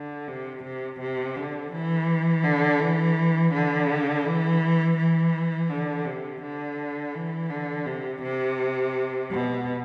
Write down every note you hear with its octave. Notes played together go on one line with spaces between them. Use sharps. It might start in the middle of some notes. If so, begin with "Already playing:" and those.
Already playing: D3
C3
C3
C3
D3
E3
D3
E3
D3
E3
E3
D3
C3
D3
E3
D3
C3
C3
B2